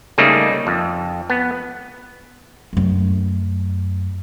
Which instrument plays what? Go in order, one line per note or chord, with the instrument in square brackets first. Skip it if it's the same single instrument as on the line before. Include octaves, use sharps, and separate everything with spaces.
[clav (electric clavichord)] C#3 G3 A3 A#3 D#4 G#4
F2
B3
[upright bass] F#2 A3